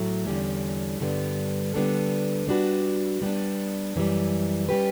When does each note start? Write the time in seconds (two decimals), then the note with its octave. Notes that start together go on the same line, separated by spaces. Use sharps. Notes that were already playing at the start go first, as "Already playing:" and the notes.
Already playing: A2 F#3 A3
0.27 E2 D3 G3 C#4
1.00 G2 D3 G3 B3
1.74 D3 G3 B3 D4 A4
2.47 G3 D4 F#4 B4
3.22 G3 B3 D4
3.96 F#2 E3 G3
4.69 G3 C#4 G4 B4